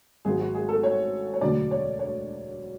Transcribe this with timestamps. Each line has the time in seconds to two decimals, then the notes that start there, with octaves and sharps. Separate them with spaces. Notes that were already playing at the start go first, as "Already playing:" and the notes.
0.25 G#1 G#2 F#3 G#4
0.40 F#4
0.54 G#4
0.69 A4
0.83 C#5
1.34 C#5
1.41 E1 D2 D3 F#3 D5
1.71 C#5
1.99 C#5